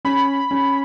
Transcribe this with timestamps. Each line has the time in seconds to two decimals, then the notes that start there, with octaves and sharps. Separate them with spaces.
0.05 C#4 B5
0.51 C#4